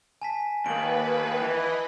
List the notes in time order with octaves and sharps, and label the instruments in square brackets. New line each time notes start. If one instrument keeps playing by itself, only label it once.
[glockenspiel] G#5 A5 B6
[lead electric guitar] D#2 A#3 [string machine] B4 [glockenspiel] D7 F#7
[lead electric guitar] E3 [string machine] D#5 B5